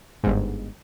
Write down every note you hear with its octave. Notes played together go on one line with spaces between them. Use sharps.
G1 G#2